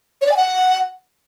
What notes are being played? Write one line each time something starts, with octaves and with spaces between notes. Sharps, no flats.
C#5
D5
G#5
F#5